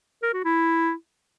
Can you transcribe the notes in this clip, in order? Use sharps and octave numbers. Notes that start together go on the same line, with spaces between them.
A#4
F#4
E4